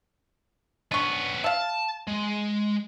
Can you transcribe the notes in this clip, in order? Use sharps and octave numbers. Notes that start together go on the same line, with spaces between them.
B3 C#4 D4 C#6
E5 F5 A5
G#3